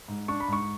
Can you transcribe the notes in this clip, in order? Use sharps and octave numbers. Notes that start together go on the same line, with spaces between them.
G#2
D4 C#6
B5
G#2 C#6